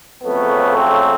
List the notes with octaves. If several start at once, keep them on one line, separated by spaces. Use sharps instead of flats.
F2 C#3 F#3 A3 B3
C4